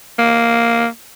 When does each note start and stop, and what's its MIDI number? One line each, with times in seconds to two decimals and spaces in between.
0.19 0.87 58